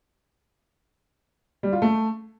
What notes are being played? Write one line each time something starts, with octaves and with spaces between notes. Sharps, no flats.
G3
F4
A3